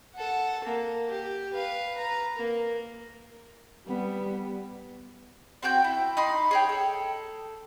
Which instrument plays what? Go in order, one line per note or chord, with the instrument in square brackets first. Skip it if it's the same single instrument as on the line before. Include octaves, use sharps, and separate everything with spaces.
[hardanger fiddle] A4 F#5
A#3
G4
B4 F5
B4 A#5
A#3
[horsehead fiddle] G3 B3
[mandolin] C4 F#4 G5 G6
E4
D#4 B5 C6
G#4 C#5 G5
A4